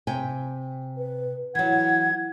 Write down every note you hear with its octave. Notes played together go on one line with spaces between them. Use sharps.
C3 G5 G#5
B4
E3 F#3 F#5 G#6